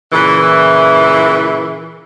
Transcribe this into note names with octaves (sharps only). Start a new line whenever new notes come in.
A#2 C#3 E3